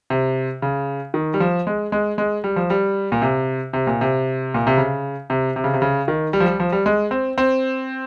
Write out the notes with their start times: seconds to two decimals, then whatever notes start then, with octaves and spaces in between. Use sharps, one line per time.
0.10 C3
0.62 C#3
1.14 D#3
1.34 G3
1.40 F3
1.67 G#3
1.92 G#3
2.18 G#3
2.44 G3
2.56 F3
2.70 G3
3.12 A#2
3.22 C3
3.73 C3
3.87 A#2
4.01 C3
4.54 A#2
4.67 C3
4.77 C#3
5.30 C3
5.56 C3
5.64 C#3
5.73 C3
5.82 C#3
6.08 D#3
6.33 G3
6.40 F3
6.46 G3
6.60 F3
6.72 G3
6.86 G#3
7.11 C4
7.38 C4